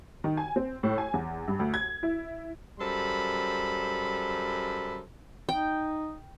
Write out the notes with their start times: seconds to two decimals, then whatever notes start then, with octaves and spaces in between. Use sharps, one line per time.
0.24 D#3
0.37 G#5
0.56 C4
0.83 A2
0.98 G#5
1.14 E2
1.48 G2
1.59 D2
1.74 G#6
2.03 E4
2.79 F#2 G3 A4 C5 B5
5.49 D#4 G5